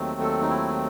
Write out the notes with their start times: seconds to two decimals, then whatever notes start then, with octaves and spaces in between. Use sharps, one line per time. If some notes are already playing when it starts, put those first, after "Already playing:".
Already playing: D#2 D#3 F#3 A3 C4
0.21 A4
0.41 D#4
0.50 E4